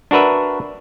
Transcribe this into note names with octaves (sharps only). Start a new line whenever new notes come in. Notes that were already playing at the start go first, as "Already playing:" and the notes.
D4 F#4 A#4 B4 E5